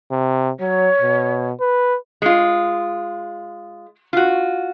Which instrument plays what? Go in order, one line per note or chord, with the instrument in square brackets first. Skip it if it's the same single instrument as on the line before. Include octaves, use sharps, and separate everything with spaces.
[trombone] C3
[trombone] F#3 [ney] C#5
[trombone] B2
B4
[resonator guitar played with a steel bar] G#3 F4
F4 F#4